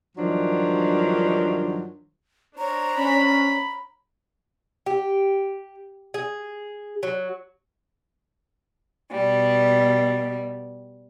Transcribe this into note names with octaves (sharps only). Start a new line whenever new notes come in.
G2 D#3 F3 F#3 D4
D4 C5 C#5 A#5
C#4 B5
G4
G#4
F#3
B2 G3